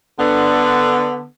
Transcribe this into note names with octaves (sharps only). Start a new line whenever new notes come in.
D3 B3